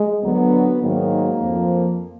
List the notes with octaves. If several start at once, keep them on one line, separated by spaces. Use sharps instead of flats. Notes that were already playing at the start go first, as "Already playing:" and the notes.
Already playing: G#3
D2 D3 F#3 B3
G#2 D#3 F#3 A#3
F2 F3